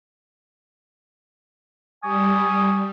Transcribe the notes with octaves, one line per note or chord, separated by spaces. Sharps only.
G3 G#5 C#6 D#6